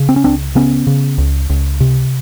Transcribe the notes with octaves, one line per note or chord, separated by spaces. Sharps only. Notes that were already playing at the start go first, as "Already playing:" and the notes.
Already playing: C#3
C4
C#4
C#2 C4 D4
C#3 B3 C#4
C#3
C#2
C#2
C3